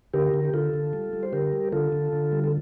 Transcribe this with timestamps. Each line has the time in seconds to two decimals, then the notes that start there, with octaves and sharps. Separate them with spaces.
0.14 D3 G4 A#4
0.34 D3
0.45 G4
0.54 D3 F4 A4
0.73 D3
0.93 G3
1.13 G3
1.23 C5
1.33 D3 G4 A#4
1.53 G3
1.72 D3 F4 A4
1.92 D3
2.13 D3
2.32 G3
2.44 A4